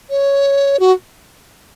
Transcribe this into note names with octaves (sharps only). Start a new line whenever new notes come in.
C#5
F#4